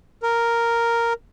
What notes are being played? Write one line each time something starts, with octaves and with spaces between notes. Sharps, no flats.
A#4